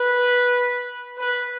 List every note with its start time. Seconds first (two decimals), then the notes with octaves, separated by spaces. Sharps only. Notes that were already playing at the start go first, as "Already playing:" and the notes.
Already playing: B4
1.18 B4